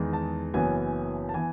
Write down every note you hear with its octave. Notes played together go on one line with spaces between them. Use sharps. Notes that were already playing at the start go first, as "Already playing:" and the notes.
Already playing: E2 D#3 G#3 D#4
A5
F#1 F#2 E3 B3 G#5
A5
E3 B3 G#5